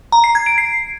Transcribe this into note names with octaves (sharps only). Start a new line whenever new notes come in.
A#5
C7
G#6
D7
C7